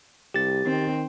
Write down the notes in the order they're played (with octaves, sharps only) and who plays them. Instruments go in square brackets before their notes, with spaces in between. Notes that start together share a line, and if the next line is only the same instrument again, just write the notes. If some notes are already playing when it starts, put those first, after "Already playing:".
[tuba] C2 [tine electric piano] G4 A6
[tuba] D#3 [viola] C4